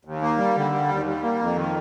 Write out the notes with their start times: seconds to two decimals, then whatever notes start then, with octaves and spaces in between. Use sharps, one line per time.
0.05 D#2
0.21 A#3
0.38 G3
0.55 D3
0.71 G3
0.89 D#2
1.06 G3
1.22 A#3
1.39 F2
1.56 D#3